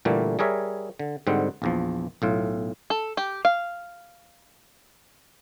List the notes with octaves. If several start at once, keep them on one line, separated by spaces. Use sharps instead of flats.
A#2 D3 E3 G3 A3 A#3
G3 G#4 A#4 C#5 E5
D3
G#2 D3 G3 C4 F#5
A#1 E2 F3
B1 A2 F4
A4
G4
F5